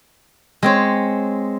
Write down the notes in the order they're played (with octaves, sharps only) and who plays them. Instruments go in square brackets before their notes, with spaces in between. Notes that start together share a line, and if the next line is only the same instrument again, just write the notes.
[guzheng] G#3 C4 C#5